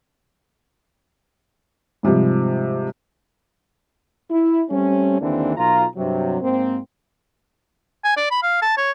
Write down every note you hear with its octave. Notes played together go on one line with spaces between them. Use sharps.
G#2 C3 F3 G3
E4
G3 A3 C4 C#4
D#2 D3 E3 A#3 C4 D4
B1 F4 A#5
G2 C3 F#3
G#2 A#3 C4
G#5
D5
B5
F5
A5
C#5